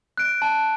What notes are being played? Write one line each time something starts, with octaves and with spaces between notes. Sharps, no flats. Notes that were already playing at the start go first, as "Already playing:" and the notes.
F#6 D7
A5